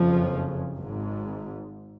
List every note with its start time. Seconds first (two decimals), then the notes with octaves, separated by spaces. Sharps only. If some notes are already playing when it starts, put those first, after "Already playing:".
Already playing: F#1 F2 C#3 F3
0.75 G#1 G#2